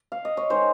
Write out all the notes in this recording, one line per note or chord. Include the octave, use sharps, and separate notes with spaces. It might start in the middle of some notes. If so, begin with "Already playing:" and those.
Already playing: G5
F5
D#5
C#5
D#3 G#3 D#4 C5